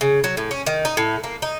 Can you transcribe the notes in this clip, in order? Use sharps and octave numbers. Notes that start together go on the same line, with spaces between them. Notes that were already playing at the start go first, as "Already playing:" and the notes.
C#3
F#3
A2
C#4
D#3
D#4
A2
A#3
D#4